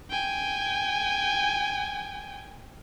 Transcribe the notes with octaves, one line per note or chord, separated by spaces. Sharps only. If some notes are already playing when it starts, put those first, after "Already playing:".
G5 G#5